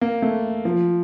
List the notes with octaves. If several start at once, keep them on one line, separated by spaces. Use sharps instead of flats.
A#3
A3
F3